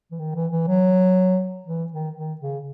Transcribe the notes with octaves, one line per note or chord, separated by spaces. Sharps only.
E3
D#3
E3
E3
F#3
E3
D#3
D#3
C#3